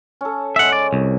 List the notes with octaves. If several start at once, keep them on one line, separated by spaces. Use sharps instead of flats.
C#4 A4
C#3 G#3 E5 F#5
D5
C2